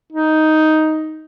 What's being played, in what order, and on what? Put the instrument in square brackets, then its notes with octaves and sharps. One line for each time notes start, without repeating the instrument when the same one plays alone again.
[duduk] D#4